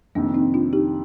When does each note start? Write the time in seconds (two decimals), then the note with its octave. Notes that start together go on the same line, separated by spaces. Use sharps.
0.15 F2 C3 D#3 A#3 D4
0.34 C4 D#4
0.54 D4 F4
0.73 D#4 G4